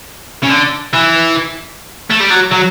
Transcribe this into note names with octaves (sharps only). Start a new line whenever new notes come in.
C#3
D3
E3
A3
G3
F#3
F#3